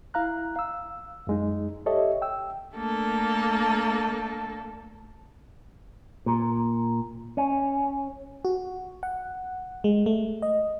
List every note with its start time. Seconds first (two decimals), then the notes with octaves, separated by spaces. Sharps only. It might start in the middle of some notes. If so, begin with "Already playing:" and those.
0.14 E4 F5 A#5 F#6
0.56 F5 E6
1.27 F#2 G#3 D#4
1.86 G4 A4 C#5 D#5 E5
2.22 G5 E6
2.76 A3 A#3 D4 A4
6.26 A#2
7.37 C#4
8.45 F#4
9.03 F#5
9.84 G#3
10.06 A3
10.42 D#5